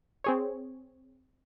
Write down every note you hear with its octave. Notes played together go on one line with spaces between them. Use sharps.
C4 G#4 C#5